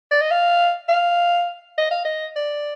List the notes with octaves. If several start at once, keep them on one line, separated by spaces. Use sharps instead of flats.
D5
D#5
F5
F5
D#5
F5
D#5
D5